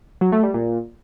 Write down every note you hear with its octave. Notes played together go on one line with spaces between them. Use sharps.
F#3
A3
G3
A#2